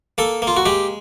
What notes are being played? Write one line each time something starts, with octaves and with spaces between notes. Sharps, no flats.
A#3 A4
A#3
F4
F#4
G#3 G4